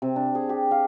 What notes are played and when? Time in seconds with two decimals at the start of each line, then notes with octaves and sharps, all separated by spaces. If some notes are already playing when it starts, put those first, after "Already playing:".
0.02 C3
0.16 D4
0.35 G#4
0.49 G4
0.71 F5